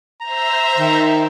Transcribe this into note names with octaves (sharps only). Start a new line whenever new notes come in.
C5 E5 A#5
D#3